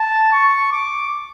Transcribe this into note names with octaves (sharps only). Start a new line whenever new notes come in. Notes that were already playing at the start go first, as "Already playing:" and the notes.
Already playing: A5
C#6
D6